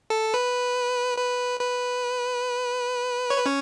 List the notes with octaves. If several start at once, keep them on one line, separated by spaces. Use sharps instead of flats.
A4
B4
B4
B4
C#5
B4
C#4 C#5